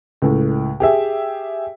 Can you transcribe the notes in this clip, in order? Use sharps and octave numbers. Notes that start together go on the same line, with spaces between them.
C#2 A2
G4 G#4 E5